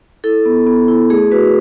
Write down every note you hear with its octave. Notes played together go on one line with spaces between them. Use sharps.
E4 A4
B3
B3
E4
A3 G#4
F#4 B4